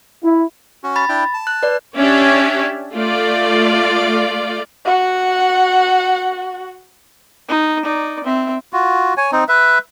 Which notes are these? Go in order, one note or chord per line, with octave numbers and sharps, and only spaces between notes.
E4
C#4 F#4
B5 A6
D4 E4 G5
A5
F#6
B4 D5
C#4 D4 G4 C#5 D5 E5
A3 F4 D5
F#4 F#5
D#4
D#4 D5
C4 E5
F4 F#4
C#5 G#5
C4 D#4
B4 E5